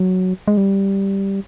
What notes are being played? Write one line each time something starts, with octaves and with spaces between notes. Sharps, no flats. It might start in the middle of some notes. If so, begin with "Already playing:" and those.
Already playing: F#3
G#3
G3